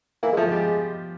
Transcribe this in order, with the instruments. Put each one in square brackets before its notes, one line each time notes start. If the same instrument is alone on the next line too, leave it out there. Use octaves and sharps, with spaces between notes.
[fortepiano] E3 E4 [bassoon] A#3
[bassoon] G#3
[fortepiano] F3 F4 [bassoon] A3
[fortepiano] G3 G4 [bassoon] G#3